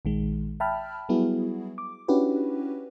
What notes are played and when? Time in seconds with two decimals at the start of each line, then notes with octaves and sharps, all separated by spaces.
0.05 A#1 D#3 G#3
0.60 E5 G5 A5 B5 F6
1.09 F#3 G3 B3 E4 F#4 G#4
1.78 D6
2.08 C#4 D4 E4 F#4 G4 B4